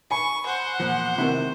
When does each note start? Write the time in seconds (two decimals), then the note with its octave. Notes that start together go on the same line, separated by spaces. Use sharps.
0.11 G#5 B5 C#6
0.46 C5 F#5
0.80 E2 A#2 F3
1.18 C3 D#3 A3 E4 B5